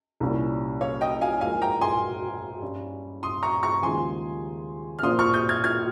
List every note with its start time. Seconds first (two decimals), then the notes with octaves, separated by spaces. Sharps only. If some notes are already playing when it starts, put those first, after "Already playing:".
0.20 C2 A#2 G3 C#4
0.81 C#5 F5
1.01 D#5 G5
1.21 F5 G#5
1.41 G#2 F3 A#3 F5 G#5
1.62 G5 A#5
1.81 G#5 C6
2.62 G2 G3 C#4
3.23 C6 D#6
3.43 A#5 C#6
3.63 A#5 C#6
3.83 D#2 C#3 F3 G#3 G#5 C6
4.99 F6
5.03 A#2 F3 C4 C6 D#6
5.19 C#6 F6
5.33 D#6 G6
5.49 F6 G#6
5.64 F6 G#6